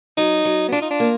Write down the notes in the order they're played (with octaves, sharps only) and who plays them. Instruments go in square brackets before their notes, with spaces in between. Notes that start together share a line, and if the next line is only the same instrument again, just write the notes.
[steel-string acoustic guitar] F#3 [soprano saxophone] D#4
[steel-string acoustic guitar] F#3
[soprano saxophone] B3
[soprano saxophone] D4 [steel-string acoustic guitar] F4
[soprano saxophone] D#4
D4
[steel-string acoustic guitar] A#3